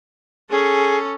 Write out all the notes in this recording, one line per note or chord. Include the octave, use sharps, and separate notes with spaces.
C#4 G#4 A4